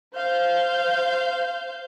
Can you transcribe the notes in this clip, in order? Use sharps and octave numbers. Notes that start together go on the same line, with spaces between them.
C5 F5 G6